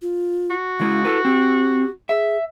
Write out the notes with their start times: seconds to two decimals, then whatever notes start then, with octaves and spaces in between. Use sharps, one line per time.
0.02 F4
0.51 F#4
0.80 C#3 G#3 E4
1.05 E4 A4 B4
1.25 C4 G4
2.09 G#4 E5